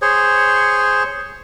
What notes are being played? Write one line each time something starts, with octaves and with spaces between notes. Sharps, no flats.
G#4 C5 C#5